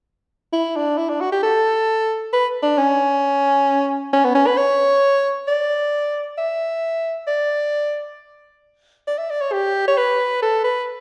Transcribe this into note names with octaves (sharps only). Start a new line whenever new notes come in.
E4
D4
E4
D4
F#4
G4
A4
B4
D4
C#4
C#4
B3
C#4
B4
C#5
D5
E5
D5
D5
E5
D5
C#5
G4
C#5
B4
A4
B4